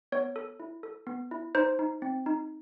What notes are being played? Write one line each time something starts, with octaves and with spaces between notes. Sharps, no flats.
B3 C#5
A4
E4
A4
B3
E4
D#4 C5
D#4
C4
D#4